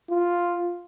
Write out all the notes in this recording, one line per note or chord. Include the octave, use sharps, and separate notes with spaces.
F4